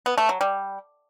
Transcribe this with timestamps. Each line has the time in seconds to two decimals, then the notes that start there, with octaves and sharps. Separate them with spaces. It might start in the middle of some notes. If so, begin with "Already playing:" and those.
0.06 B3
0.18 A3
0.29 F#3
0.41 G3